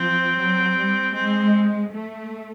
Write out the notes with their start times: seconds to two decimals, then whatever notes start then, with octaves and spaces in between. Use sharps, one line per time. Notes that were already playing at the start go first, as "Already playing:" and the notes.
Already playing: F3 C4
0.36 F#3
0.75 G3
1.14 G#3 C4
1.91 A3